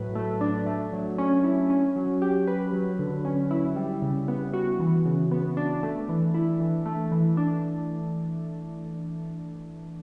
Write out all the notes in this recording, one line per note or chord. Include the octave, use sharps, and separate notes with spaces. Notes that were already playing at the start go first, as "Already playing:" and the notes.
Already playing: A2 F#3 B4
A3
D4
A3
F#3
C#4
E4
C#4
F#3
G4
B4
F#3
D3
C#4
E4
G3
C#3
B3
F#4
E3
C#3
B3
D4
A3
E3
E4
E3
A3
E3
D4